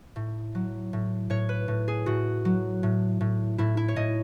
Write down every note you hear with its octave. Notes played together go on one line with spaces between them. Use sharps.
A2
F#3
A2
A2 C#5
B4
A2
G#4
A2 F#4
F#3
A2
A2
A2 E4
E4
C#5
A2 D#5